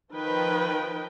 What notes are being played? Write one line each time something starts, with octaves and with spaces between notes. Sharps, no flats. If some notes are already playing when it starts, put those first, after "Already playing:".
D#3 F3 B4 D#5 G5